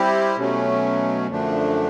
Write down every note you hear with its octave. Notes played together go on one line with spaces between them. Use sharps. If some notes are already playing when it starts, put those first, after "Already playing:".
Already playing: G3 C4 E4 G4
B2 F#3 A3 C#4
F#2 D3 F3 A3 D4